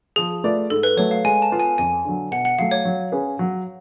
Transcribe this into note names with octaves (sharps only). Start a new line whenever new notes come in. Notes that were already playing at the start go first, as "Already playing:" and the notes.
F3 G#4
A3 F4 B4 D5
G#2 A4
B4
F#3 A3 C#5
F5
G#3 G#5
A5
B3 F4
G#5
F2 G#5
D3 F#3
B2 F#5
F#5
F#3 A3 F5
C#5
F#3
C#4 G#4 B4
F#3